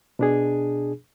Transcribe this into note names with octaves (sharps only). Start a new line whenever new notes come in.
B2 D4 G#4